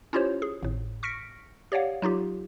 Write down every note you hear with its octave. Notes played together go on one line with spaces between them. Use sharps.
C#4 E4 F4 G4 C5 C#5
G#4
G#1 A2
C#6 F6 A#6 B6 C#7 D7
G4 C#5 D5 F5 F#5
F#3 D#4 F4 G4